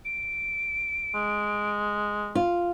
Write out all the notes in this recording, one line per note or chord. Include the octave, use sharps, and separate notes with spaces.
D7
G#3
F4